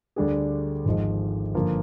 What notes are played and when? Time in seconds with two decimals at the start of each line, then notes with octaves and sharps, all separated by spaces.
0.16 D2 D3 G3 D4 G#4
0.85 G#1 G#2 F3 G#3
1.55 G1 G2 F3 A#3